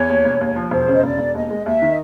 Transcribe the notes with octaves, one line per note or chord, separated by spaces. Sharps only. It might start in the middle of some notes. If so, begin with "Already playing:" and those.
Already playing: E2 C#5
D#2
E1
D#2
F3
E1 C5
C#3
D#5
E1 D5
E1
D#2 D#5
G#3
D#2 E5
D#3
D#5